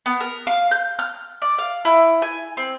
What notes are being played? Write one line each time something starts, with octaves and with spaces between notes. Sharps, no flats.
B3
A#4
F5
G6
F6
D5
F5
E4
G#5
C4